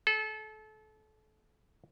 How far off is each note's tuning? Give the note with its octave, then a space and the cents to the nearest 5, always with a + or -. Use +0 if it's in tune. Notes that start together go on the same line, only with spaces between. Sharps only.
A4 -30